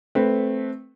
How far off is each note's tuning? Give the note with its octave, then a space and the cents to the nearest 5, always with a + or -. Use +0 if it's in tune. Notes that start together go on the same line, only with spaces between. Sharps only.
A3 -15 C4 +0 B4 +0